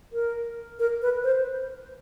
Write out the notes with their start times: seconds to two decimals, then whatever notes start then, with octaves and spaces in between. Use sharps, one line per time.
0.13 A#4
0.79 A#4
1.02 B4
1.24 C5